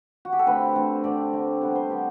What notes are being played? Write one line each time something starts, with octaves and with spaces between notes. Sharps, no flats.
F#4
G4
A4
D3 A3 C4 B4
D3 A3 C4
D3 A3 C4 D5
D3 A3 C4
C3 G3 B3 F#5
C5
C3 G3 B3 G4